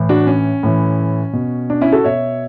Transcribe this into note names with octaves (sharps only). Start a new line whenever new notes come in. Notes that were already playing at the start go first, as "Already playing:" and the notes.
Already playing: A2 E3
D4 F#4
C#4
A2 E3
B2
D4
C#4 E4
F#4 A4
B2 C#5 E5